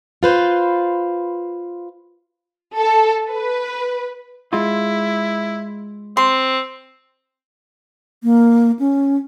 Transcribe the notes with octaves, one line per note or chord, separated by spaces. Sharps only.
F4 B4 C5
A4
B4
G#3 E4 F4
C4 C6
A#3
C#4